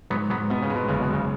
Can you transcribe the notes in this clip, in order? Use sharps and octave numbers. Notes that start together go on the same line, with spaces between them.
G#2 F#3 B3
G#2 F#3 B3
B2 B3
C#3
G#3
B2
F#1 C#3
B2
F#1 C#3